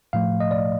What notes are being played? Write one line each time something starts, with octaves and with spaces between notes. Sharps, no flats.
A2 F3 A3 F5
D#5
D5